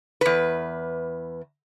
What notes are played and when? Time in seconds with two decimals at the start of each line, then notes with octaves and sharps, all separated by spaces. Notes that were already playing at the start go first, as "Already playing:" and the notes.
0.21 E2 B4